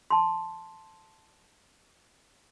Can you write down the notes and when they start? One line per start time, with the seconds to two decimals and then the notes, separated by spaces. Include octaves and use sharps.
0.10 A5 C6